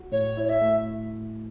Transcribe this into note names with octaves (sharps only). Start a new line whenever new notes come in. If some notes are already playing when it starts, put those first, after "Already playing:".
Already playing: F#4
A2 C#5
E4
C#5
E5
A3